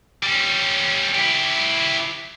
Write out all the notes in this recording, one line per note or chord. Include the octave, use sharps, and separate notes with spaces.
G3 C#4
E4 G4